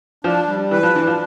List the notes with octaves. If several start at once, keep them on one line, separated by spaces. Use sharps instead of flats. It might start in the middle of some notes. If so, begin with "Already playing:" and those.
F3 D4
G3
E3 B4
F3
E3 D4
F3